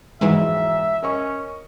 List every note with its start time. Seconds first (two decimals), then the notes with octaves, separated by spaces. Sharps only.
0.21 E1 A#1 G#2 E3 F#3 G#3 E5
1.03 C#4 A#4 D#5 C#6